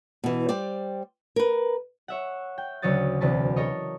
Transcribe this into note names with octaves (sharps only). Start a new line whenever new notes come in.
B2 E3
G3 G4 C5 D5
A#4 B4
C#5 E5 F#5
G5
D2 C#3 F#3 C#5 D#6 A6
E1 D2 C3 B4 A5
A4 A#4 C#5 D#5